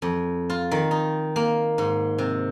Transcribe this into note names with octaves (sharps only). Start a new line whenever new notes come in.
F2
F4
D#3
D#4
A#3
G#2
C3